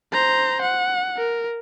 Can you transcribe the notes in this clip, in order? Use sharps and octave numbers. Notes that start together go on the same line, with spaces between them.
C5 A#5
F#5
A#4